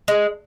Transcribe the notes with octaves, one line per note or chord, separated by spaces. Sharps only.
G#3